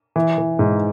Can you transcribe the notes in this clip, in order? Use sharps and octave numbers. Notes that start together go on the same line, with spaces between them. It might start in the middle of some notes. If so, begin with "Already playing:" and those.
E3
E3
G#2